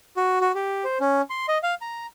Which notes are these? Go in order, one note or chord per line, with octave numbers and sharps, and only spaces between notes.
F#4
F#4
G4
C5
C#4
C6
D#5
F5
A#5